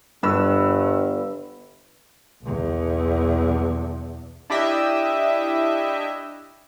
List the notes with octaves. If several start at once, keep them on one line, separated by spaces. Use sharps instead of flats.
G1 G2 B4 E6
B1 E2
D4 E4 G4 D#5 E5